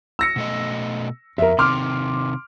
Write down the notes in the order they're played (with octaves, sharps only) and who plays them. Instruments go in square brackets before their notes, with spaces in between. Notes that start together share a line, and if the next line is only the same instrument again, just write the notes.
[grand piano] E6 A#6 C#7
[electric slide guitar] B2 A3 D#5
[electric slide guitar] F2 [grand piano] A#4 E5
[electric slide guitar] C3 D#3 [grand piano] C6 D6 F6